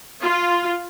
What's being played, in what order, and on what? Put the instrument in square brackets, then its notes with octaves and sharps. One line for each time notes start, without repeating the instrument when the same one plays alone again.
[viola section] F4